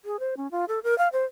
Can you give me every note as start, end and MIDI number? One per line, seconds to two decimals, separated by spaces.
0.05 0.19 68
0.19 0.34 72
0.37 0.50 61
0.51 0.65 65
0.68 0.79 69
0.83 0.97 70
0.98 1.08 77
1.12 1.25 72